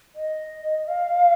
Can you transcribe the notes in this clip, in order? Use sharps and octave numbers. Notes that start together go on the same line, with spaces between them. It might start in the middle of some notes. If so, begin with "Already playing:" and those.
D#5
F5